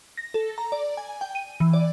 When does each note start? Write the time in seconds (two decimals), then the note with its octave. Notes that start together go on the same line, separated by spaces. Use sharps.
0.17 A#6
0.34 A4
0.58 A#5
0.72 D5
0.97 G#5
1.21 G5
1.35 D#7
1.60 E3
1.73 D5